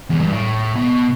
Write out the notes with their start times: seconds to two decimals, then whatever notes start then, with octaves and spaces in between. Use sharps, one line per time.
0.10 E2
0.21 G2
0.31 A2
0.76 B2